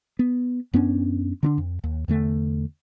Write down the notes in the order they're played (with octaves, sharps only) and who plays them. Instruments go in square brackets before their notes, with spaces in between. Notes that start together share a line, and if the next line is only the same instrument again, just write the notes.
[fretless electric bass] B3
F#2 B3 C#4 D4
D3 C#4 D4
F2
D#2
E2 D3 A3